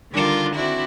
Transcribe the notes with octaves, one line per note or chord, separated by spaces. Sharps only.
D3 D#3 G3 D4 F4 A#4
C4 D4 E4 F#4